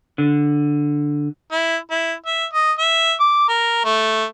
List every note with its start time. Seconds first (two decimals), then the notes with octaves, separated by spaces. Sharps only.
0.18 D3
1.52 E4
1.91 E4
2.26 E5
2.53 D#5
2.79 E5
3.20 D6
3.49 A#4
3.84 A3